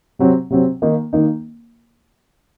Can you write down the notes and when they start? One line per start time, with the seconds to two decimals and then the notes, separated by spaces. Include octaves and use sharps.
0.19 C3 F#3 C4
0.50 C3 F#3 C4
0.82 D#3 A#3 D#4
1.13 D#3 A#3 D#4